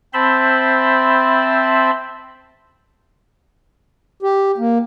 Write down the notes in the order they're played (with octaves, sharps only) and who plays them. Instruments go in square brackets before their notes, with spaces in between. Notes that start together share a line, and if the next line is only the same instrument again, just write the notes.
[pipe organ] C4 C5 E5 A5 B5 C6
[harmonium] G4
A#3